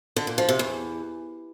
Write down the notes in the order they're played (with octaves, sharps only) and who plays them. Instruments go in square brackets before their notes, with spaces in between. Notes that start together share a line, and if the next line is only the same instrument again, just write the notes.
[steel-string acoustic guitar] D3
A#2
F3
C3
E2